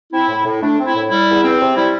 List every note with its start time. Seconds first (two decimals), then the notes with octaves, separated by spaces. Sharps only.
0.13 C4 E4
0.29 A2
0.46 A2
0.62 A3 D4
0.79 C4
0.86 E4
0.95 A2
1.10 G3 E4
1.28 E2
1.44 C4
1.60 C3
1.76 G3 E4